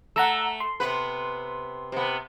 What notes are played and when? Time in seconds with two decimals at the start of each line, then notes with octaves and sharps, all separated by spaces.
0.16 A3 F#5 A#5 E6
0.60 C6
0.80 C3 B3 B4
1.92 C3 B3